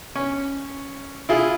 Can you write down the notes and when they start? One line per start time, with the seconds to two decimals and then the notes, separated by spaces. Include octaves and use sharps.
0.15 C#4
1.29 E4 F4 G#4